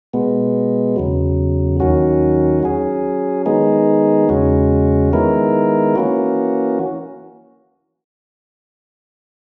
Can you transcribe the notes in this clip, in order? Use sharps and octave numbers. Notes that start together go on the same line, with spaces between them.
B2 G#3 B3
E2 C#3 F#3
D#2 D#3 F#3 C#4 F#4
F#3 C#4 G#4
D#3 G#3 B3 D#4 G#4
E2 C#3 G#3 C#4 F#4
D#3 G#3 B3 E4 A#4
E3 A#3 C#4 F#4